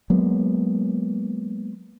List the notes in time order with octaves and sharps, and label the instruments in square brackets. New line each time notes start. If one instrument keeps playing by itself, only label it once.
[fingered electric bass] F#3 G#3 A#3 B3